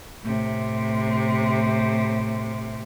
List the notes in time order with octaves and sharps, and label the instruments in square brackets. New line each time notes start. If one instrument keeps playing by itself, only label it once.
[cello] A2 C3